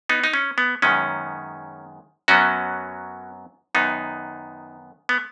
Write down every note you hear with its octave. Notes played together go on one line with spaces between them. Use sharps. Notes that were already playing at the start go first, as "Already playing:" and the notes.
B3 D#4
D#4
C#4
B3
F#2 D#3 G#3 B3 C#4
F#2 F#3 B3 C#4 F#4
F#2 D#3 B3 D#4
B3